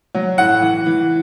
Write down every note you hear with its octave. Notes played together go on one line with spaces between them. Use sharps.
F#3
A2 F#5
E3
E3